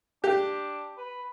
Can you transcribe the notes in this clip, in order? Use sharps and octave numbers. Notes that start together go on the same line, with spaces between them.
D4 G4
B4